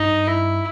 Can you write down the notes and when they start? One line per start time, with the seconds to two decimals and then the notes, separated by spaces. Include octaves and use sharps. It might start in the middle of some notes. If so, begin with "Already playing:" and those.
Already playing: G2 D#4
0.27 E4